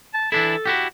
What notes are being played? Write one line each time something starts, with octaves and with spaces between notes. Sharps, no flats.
A5
E3 D4 E4 A4
E4 F#4 G4